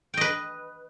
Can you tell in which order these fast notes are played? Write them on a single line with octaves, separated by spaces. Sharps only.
G5 D#5 B4